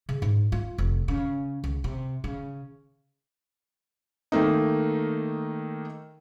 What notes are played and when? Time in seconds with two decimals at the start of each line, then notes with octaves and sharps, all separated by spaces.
0.09 C#3
0.22 G#2
0.52 F4
0.78 F1
1.08 C#3
1.64 C#2
1.84 C3
2.24 C#3
4.32 D#3 A3 A#3 D#4